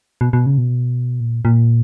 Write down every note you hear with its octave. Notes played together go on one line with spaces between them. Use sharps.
B2
B2
C#3
B2
A#2
A#2